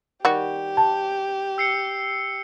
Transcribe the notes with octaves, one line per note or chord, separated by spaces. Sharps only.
D#3 G3 F#4 G4
A5
E6 C7 C#7